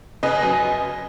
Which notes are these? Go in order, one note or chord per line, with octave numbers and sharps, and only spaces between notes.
C#3 B4 D#5
F#2